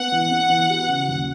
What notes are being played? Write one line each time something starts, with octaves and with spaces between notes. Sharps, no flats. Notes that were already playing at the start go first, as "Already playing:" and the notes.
Already playing: B3 F#5
E3
B3
E3
F#4
C#3
D#2